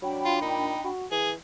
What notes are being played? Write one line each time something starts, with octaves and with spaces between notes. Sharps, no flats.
F#3 D4 G5 B5
F4
A#2 D#4
F#4
E3 G#4